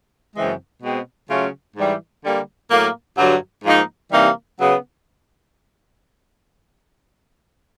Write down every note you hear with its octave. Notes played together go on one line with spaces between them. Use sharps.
F#2 C#3 E3 G#3 C4
B2 G#3 C4
C#3 F#3 A3 C#4 F4
G#2 E3 G3
D3 G3 A#3
A2 F#3 A#3
G2 D3 F#3
G#2 F3 A#3 D#4
C3 E3 G3 A#3 D#4
C#3 F#3 B3